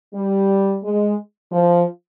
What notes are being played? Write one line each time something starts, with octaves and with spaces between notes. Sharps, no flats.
G3
G#3
F3